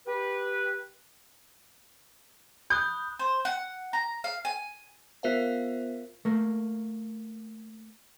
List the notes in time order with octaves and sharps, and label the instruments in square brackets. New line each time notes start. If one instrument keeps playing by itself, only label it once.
[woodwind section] G4 B4
[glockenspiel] B5 D#6 F#6 [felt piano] G6
[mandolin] C5
F#5
A#5
F5
G#5
[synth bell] B3 F4 A#4 C5 E5 F5
[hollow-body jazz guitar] A3 A#3